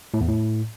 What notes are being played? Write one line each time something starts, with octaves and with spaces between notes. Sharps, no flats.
A2
E2
A2